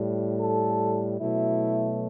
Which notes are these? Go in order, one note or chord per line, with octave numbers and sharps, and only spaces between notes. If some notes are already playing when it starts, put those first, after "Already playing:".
Already playing: A2 G3
A4
B2 F#3 A3 E4